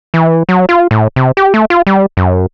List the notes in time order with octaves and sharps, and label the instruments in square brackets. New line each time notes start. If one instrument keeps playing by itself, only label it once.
[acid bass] E3
F#3
F4
A2
C3
G4
A3
F4
G3
F#2